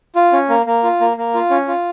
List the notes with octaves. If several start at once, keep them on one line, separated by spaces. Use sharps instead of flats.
F4
C#4
A#3
A#3
F4
A#3
A#3
F4
C#4
F4